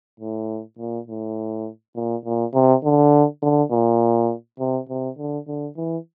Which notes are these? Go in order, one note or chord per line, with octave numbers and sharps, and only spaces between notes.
A2
A#2
A2
A#2
A#2
C3
D3
D3
A#2
C3
C3
D3
D3
E3